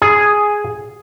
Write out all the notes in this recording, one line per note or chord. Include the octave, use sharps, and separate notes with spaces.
G#4